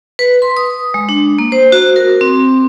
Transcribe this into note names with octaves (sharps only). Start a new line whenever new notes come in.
B4
C6
D#6
G#3
D4
A#3
C5
F#4
A#4
C4